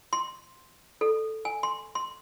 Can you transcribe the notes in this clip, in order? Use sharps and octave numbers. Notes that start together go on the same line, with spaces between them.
C6
A4
G#5
C6
C6